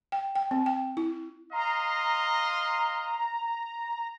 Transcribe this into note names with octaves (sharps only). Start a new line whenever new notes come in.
G5
G5
C4
G5
E4
D#5 F5 A#5 C6